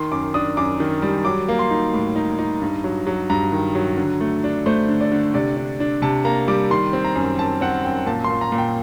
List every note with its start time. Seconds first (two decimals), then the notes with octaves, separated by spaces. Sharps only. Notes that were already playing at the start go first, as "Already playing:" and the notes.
Already playing: D#3 C6
0.11 F#2 D6
0.34 D4 D#6
0.57 F#2 D6
0.80 D#3
1.02 G3
1.25 F#3 D6
1.49 A#3
1.59 C6
1.70 D#4
1.94 A2
2.16 D#4
2.39 D#4
2.62 G2
2.84 F#3
3.07 F#3
3.30 G2 A#5
3.52 D#3
3.75 F#3
3.97 D3
4.20 A3
4.44 D4
4.66 A3 C5
4.89 D3
5.01 D5
5.12 D3
5.34 C3 D5
5.57 D4
5.80 D4
6.02 C3 A5
6.25 A#3 A#5
6.48 G3 D6
6.71 D#3 C6
6.93 C4
7.05 A#5
7.15 F#2
7.39 F#2 A5
7.61 C4 F#5
7.84 F#2 G5
8.06 A#2 A5
8.24 C6
8.30 A#2
8.41 A#5
8.52 A#2
8.58 G5